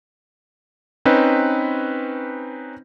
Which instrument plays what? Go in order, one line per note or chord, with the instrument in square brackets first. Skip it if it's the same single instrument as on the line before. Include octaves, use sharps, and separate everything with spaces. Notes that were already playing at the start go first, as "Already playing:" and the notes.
[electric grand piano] C4 C#4 D#4 B4